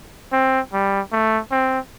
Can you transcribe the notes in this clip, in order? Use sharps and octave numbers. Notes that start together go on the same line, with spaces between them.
C4
G3
A3
C4